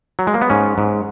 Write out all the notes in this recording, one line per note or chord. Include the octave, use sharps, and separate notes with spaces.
F#3
G#3
A#3
B3
G#2 C#4
G#2